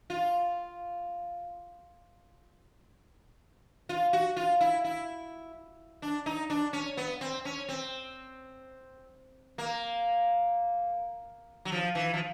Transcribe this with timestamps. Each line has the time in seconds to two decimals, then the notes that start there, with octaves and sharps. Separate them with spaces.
0.10 F4
3.89 F4
4.13 F#4
4.37 F4
4.61 E4
4.84 E4
6.02 D4
6.26 D#4
6.50 D4
6.73 C#4
6.97 B3
7.21 C4
7.45 C#4
7.69 C4
9.58 A#3
11.65 F#3
11.72 F3
11.95 E3
12.14 F3